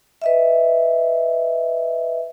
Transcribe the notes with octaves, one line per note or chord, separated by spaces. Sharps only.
B4 D#5 E5